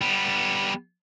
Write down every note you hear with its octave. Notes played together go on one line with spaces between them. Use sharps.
G3 B3